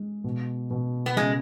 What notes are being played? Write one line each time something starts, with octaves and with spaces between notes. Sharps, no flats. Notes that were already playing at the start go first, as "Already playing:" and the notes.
Already playing: G#3
B2
B2
B3
C#3 G#3